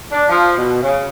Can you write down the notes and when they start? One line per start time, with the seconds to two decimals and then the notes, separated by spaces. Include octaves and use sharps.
0.12 D4
0.29 F3
0.56 B2
0.82 C#3